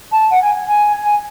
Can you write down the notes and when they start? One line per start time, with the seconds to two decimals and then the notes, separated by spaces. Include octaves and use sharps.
0.11 A5
0.30 F#5
0.42 G#5
0.67 G#5
1.02 G#5